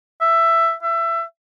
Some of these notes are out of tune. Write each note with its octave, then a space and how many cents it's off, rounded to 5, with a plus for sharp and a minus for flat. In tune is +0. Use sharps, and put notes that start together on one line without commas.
E5 +10
E5 +20